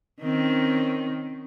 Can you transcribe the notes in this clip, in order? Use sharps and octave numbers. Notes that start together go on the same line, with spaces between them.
D#3 C4 C#4